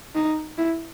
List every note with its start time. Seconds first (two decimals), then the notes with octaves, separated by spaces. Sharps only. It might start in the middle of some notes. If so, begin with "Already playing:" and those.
0.15 D#4
0.58 E4